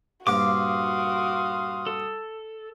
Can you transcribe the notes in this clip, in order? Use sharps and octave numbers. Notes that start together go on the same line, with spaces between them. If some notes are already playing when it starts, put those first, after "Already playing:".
G2 A#2 F3 F#4 F5 C6 D6 D#6
A4